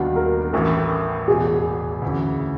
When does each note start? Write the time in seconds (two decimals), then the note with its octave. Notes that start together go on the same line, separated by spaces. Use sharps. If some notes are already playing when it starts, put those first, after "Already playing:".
Already playing: D#2 D#3 G3 B3 D4 F#4
0.16 A#4
0.53 A1 A2 E3 A3 A#4
1.28 E1 E2 B2 G#4
2.02 D2 C#3 E3